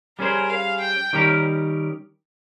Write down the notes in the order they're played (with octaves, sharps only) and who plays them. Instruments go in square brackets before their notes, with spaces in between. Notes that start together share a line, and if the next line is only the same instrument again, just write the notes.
[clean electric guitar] G3 C#4 G#4 C5 [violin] A#4
[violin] F5
G5
[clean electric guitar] D#3 G3 C#4 G4 A#4